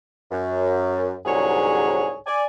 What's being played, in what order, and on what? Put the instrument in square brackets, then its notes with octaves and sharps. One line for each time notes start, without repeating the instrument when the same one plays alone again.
[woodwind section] F#2
C2 G#2 D3 F#3 G#4 C#5
D5 G#5